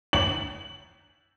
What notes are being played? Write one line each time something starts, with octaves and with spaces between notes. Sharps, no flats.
F#7